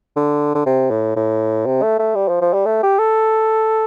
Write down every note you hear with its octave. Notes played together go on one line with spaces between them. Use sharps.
D3
D3
C3
A2
A2
C3
A3
A3
G3
F3
F3
G3
A3
G4
A4